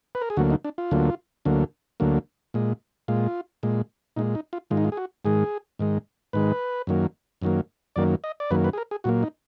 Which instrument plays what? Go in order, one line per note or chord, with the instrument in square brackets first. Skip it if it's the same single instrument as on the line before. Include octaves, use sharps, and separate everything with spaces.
[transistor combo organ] B4
A#4
G#4
D2 D3 F#3 A#3 F#4
D#4
D4
F4
D2 D3 F#3 A#3
D2 D3 F#3 A#3
D2 D3 F#3 A#3
A#2 G#3
A#2 G#3 F4
A#2 G#3
A#2 G#3 D#4
D#4
F4
G#2 D#3 G#3 F4
D#4
F4
G#4
F#4
G#2 D#3 G#3 G#4
G#2 D#3 G#3
G#2 D#3 G#3 B4
F#2 D#3 F#3 A#3
F#2 D#3 F#3 A#3
F#2 D#3 F#3 A#3 D5
D#5
D5
F#2 D#3 F#3 A#3 B4
B4
G#4
A#4
G#4
A#2 F#3 A#3 F#4
D#4